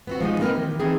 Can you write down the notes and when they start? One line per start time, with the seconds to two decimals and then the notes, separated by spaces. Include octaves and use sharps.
0.07 B3 C4 F#4
0.21 F3 G#3 D#4
0.39 A#3 C4 D#4 G4 A#4 B4
0.54 D#3 E3 G4
0.79 E3 C4 D#4 G#4 A4